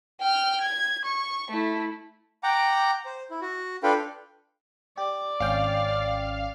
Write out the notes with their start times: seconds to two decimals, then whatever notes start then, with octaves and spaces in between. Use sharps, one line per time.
0.21 G5 F6
0.61 G#6
1.05 C#6
1.50 A3 E4
2.43 F#5 G5 A#5 D6
3.06 C5
3.30 E4
3.42 F#4
3.83 D4 F4 A4 B4 F5 G5
4.97 G4 D5
5.40 G#1 C#4 F5 G5